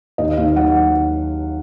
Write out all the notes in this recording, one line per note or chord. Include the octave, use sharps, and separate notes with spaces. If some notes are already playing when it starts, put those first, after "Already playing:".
D#2 D#5
D#2 F5
F#3 F#5